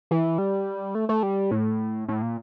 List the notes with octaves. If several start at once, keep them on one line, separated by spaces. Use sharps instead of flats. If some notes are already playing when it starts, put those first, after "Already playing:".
E3
G3
A3
A3
G3
A2
A2
A#2